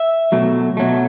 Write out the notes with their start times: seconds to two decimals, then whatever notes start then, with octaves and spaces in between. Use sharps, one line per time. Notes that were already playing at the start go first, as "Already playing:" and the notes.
Already playing: E5
0.32 B2 F#3 A3
0.77 B2 F#3 A3